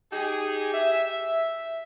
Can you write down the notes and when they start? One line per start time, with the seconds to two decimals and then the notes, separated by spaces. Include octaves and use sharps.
0.12 D#4 G4 G#4
0.74 E5